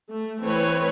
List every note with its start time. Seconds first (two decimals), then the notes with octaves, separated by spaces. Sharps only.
0.11 A3
0.41 E3 A3 C4 B4 C#5